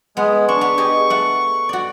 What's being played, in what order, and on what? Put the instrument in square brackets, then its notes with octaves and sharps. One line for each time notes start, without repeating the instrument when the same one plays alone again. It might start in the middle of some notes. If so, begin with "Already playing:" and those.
[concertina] G#3 [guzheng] B3
[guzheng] D4 [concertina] C#6
[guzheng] B3
G4 G#4 D#5
A3 F#5
F#4 D5